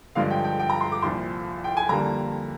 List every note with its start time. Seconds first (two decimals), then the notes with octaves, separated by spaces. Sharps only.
0.15 G2 D3 F3 G#3 F5
0.30 G5
0.45 G5
0.59 G5
0.70 A#5
0.81 C6
0.92 D6
1.02 C2 A#2 F3 C6
1.64 G5
1.77 G#5
1.89 F2 D3 G3 A#3 A#5